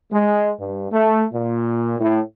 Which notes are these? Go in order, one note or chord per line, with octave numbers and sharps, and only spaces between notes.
G#3
G2
A3
A#2
A2